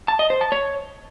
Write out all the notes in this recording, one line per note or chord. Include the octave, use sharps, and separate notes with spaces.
A5
D#5
C5
A5
C#5